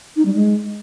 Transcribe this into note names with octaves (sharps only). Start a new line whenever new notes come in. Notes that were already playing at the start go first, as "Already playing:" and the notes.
D#4
G3
G#3